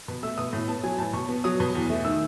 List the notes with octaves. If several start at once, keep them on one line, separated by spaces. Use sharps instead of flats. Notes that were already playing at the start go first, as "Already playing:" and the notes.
B2
A3 E6
B2 D#6
A2
B3 A5
F#3 G#5
A2 A5
B2 C#6
B3
F#3 D#6
B2
E2
A3
D#3 E6